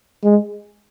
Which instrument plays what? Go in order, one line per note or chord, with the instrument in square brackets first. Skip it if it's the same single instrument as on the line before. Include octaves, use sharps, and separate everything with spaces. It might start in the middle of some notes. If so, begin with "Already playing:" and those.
[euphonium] G#3